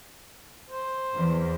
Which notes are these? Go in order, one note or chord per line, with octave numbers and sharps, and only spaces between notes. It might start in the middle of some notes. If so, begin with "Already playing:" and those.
C5
E2